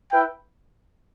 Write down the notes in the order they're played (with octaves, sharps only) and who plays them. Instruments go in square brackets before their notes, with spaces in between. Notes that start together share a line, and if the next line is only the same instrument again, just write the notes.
[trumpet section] E4 B4 E5 G5